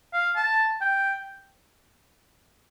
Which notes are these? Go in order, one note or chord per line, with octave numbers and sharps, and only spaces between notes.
F5
A5
G5